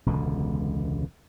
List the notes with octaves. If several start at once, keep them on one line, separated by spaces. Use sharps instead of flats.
E1 C#2 B2 D3